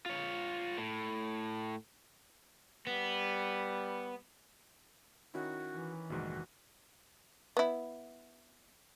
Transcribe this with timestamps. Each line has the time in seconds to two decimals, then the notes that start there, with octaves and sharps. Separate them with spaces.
0.06 F4 C#5
0.78 A2
2.87 G3 B3
5.34 D#3 C#4 E4 F#4
5.74 E3
6.10 F1 A#1 G#2 D#3 F#4
7.57 B3 E4